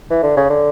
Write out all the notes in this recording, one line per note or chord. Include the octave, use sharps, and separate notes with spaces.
E3
D3
C#3
D3